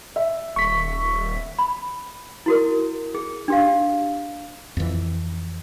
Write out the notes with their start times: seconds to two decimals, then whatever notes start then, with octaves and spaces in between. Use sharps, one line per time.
0.16 E5
0.56 D#1 C#6 B6
1.59 B5
2.46 E4 F#4 A#4
3.15 G#4
3.48 D4 G4 F5
4.77 F2 E3